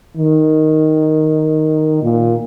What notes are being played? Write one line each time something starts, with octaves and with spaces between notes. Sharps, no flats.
D#3
A#2